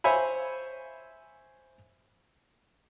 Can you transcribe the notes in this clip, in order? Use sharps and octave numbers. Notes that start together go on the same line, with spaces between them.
C5 C#5 E5 G#5 B5